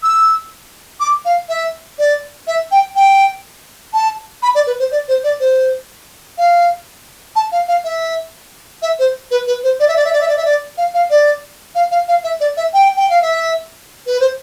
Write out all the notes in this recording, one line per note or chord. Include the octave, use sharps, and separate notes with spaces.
E6
D6
F5
E5
D5
E5
G5
G5
A5
B5
D5
B4
C5
D5
C5
D5
C5
F5
A5
F5
F5
E5
E5
C5
B4
B4
C5
D5
E5
D5
E5
D5
E5
D5
E5
D5
F5
F5
D5
F5
F5
F5
E5
D5
E5
G5
G5
F5
E5
B4
C5